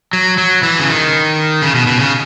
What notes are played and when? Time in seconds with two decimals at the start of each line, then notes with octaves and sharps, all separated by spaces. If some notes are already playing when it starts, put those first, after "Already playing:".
0.13 F#3
0.38 F#3
0.63 E3
0.79 C#3
0.88 D#3
1.62 C#3
1.75 B2
1.87 B2
2.00 C#3